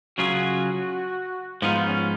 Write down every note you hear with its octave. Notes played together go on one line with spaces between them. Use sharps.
C#3 F#3 C#4 F4 F#4 G#4
G#2 F3 B3 D#4 F4
C#4